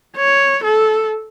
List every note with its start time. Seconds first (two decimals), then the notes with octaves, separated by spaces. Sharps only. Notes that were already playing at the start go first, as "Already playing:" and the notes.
0.17 C#5
0.63 A4